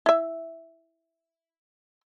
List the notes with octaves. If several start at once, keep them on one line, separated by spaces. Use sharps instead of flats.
E4 E5